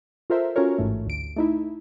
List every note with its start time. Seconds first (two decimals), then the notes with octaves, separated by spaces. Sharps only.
0.30 F4 A4 A#4 C5 E5
0.56 C#4 F4 F#4 A4 A#4 C#5
0.78 A1 G#2 A3
1.06 D2 D7
1.37 A3 D#4 E4